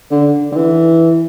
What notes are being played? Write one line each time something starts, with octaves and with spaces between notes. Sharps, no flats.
D3
D3
E3